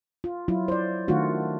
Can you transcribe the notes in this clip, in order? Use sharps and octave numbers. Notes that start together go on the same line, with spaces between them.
F4
F#3 E4 F4
C5 D5
D#3 A3 D4 F4 F#4